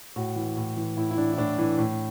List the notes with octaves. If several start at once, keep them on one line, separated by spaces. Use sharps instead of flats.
A2 F#4
E3
A2
E3
A2 E4
E4
E3 D4
E4
A2 D4
E3
A2